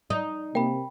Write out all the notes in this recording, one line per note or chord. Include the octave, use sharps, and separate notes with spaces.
D#4
C3 A#3 G5 B5